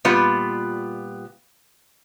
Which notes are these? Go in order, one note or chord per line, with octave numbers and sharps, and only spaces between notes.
A#2 G3 B3 F4 B4